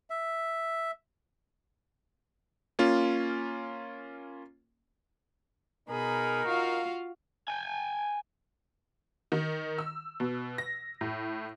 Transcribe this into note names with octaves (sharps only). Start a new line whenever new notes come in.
E5
A#3 C#4 F4
B2 D#4 G#4 A#4 B5
F4 F#4 F5
G5 G#5
D#3
E6
B2
A#6
A2